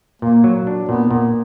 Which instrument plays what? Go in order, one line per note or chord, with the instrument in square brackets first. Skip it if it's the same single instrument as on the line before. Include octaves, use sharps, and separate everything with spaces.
[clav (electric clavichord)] A#2 [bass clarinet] A#3
[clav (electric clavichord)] F#3
D4
[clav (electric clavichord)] A#2 [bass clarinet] B3
[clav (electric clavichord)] A#2